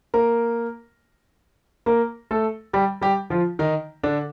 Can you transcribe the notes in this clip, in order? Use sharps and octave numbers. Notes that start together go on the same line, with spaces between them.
A#3 A#4
A#3 A#4
A3 A4
G3 G4
G3 G4
F3 F4
D#3 D#4
D3 D4